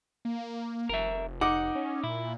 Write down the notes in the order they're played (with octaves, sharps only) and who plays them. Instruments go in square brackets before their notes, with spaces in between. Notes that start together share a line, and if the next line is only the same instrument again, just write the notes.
[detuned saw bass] A#3
[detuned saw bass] F1 [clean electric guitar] A#4 E5
[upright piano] D#4 D6 [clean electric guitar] F#5
[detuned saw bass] C#4
[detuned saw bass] A#2 [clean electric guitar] E4